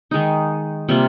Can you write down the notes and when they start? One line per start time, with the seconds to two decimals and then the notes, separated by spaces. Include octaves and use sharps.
0.11 D#3 G#3 D#4
0.89 C3 G3 A#3 F4